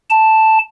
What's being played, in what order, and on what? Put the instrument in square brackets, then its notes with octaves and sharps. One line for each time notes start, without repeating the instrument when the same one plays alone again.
[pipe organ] A5